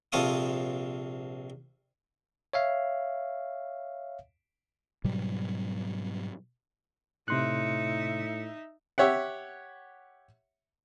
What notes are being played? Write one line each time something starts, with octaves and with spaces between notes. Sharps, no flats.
A#1 C3 F4 A4 F5 D#6
C#5 E5 F5
G#2 B2 F#3 G3
A2 C3 D#4 E5 C6 F#6 C#7
G4 C#5 E5 F#5